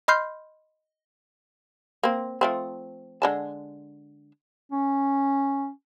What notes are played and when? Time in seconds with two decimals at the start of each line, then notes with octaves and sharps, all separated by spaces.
0.08 D#5 B5 C6 F6 G6 C7
2.03 A#3 C4
2.41 F3 A3 C4
3.22 D3 G#3 A5
4.72 C#4